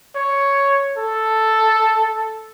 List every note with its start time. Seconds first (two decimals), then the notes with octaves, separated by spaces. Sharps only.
0.16 C#5
0.98 A4